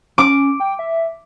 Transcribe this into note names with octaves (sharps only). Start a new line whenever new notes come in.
C#4 D6
G5
E5